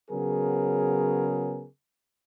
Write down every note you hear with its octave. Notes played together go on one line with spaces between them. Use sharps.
C#3 F#3 B3 G#4 A#4